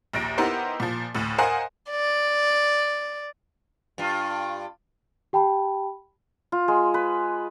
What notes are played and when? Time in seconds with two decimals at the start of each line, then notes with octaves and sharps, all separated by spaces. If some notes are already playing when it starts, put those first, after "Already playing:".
0.13 A#1 D#2 A#6 D7
0.38 B3 D#4 E4 G4 A#4 C5
0.80 A#2 F3
1.15 D2 A2
1.38 A#4 C5 D#5 F5 F#5 G#5
1.90 D5
3.98 G2 F4
5.33 G4 G5 A5 B5
6.52 F4
6.68 G#3
6.94 B4